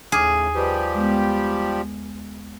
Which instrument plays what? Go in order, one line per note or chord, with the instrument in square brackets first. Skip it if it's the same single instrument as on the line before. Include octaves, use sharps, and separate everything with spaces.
[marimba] D#2 D6 F6 [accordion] A2 C#3 [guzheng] G#4
[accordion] F3 G3 G4 [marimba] B4 D#5
[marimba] G#3 B3